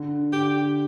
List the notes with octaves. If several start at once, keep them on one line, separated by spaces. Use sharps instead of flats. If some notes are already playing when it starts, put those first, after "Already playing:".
Already playing: D3
D3 G4